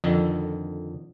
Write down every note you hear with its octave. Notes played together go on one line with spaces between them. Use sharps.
F2 D3 D#3 F3